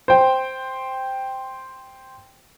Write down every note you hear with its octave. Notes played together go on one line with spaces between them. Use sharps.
C5 G5